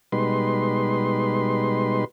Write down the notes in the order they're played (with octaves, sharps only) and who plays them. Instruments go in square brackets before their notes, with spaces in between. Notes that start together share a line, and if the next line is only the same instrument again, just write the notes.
[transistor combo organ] B2 G3 G#3 D#4 B4 C6